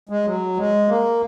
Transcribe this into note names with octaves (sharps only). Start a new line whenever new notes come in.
G#3
F#3
G#3
A#3